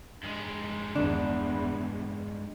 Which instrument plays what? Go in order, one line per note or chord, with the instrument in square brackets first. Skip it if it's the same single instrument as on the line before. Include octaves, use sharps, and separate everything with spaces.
[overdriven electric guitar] G2 G#3
[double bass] E2 [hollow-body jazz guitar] D4